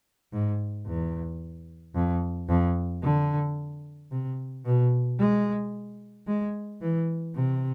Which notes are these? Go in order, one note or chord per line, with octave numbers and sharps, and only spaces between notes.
G#2
E2
F2
F2
D3
C3
B2
G#3
G#3
E3
C3